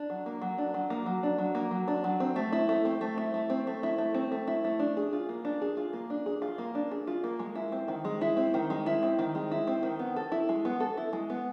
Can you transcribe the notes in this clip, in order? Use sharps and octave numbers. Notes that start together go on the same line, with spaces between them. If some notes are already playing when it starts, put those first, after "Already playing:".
Already playing: D4
F#3
A#3
F#3
D4
F#3
A#3
F#3
D4
F#3
A#3
F#3
D4
F#3
C4
A3
E4
A3
C4
A3
E4
A3
C4
A3
E4
A3
C4
A3
E4
A3
D4
G#4
F4
A#3
D4
G#4
F4
A#3
D4
G#4
F4
A#3
D4
G#4
F4
A#3
G#3
E4
C4
D#3
G#3
E4
C4
D#3
G#3
E4
C4
D#3
G#3
E4
C4
D#3
B3
A4
E4
G#3
B3
A4
E4
G#3
B3